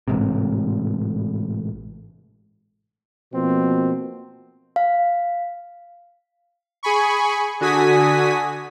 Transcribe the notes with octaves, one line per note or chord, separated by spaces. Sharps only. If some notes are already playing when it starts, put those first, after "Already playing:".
A1 G#2 C3
B2 F3 A#3 C4
F5
G#4 G#5 B5 C#6
D3 F#4 G#5 D#6 B6